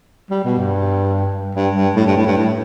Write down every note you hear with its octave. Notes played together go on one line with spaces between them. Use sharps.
G3
B2
G2
G2
G2
A2
G2
A2
G2
A2